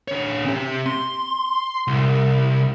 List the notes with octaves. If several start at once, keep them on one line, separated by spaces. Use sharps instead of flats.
D3 C#5
C4 G4
C6
C2